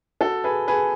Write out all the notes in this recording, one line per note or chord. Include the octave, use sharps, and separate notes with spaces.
F#4 A4
G#4 B4
G#4 B4